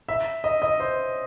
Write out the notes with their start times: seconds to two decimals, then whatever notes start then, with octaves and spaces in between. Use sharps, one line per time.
0.08 E5
0.44 D#5
0.62 D#5
0.80 C5